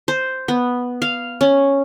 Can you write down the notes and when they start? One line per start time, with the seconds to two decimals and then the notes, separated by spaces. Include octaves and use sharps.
0.08 C5
0.48 B3
1.02 F5
1.41 C#4